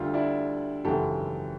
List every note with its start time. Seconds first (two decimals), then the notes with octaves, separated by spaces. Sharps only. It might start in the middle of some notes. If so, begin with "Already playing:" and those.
Already playing: D2 D3 G3 F4 G4
0.14 D4 E4
0.85 G#1 F#2 C#3 E3 G4 A4